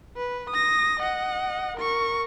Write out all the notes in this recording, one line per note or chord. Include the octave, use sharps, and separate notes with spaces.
B4
D#6 A#6
D#5 F#5
A#4 C#6